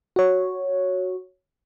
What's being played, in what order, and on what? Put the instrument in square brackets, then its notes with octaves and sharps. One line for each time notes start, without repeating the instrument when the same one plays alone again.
[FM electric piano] F#4 C#5